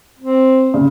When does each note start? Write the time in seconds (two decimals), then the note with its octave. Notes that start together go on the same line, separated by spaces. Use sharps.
0.19 C4
0.74 C#3